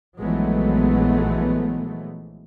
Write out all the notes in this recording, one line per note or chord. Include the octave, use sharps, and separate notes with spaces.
A#1 E3 F#3 G#3 A3 B3